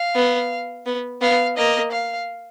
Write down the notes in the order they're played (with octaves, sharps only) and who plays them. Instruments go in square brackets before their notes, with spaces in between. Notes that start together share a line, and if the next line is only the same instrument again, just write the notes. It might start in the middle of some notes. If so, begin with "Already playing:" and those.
Already playing: [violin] F5
[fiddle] B3
B3
[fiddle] B3 [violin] F5
[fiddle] A#3 [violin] D#5
[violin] F5